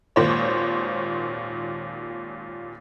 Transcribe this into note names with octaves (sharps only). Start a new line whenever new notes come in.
G#1 D#2 A#2 C5 C#5